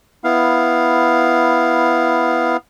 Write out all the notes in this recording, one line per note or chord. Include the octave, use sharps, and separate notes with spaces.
B3 E4 F5